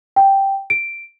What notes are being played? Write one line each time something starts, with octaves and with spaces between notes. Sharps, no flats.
G5
D7